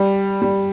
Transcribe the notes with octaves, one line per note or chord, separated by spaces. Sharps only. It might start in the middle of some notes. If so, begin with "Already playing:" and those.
Already playing: G3
G3